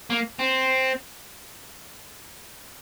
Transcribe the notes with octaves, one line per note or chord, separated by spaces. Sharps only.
A#3
C4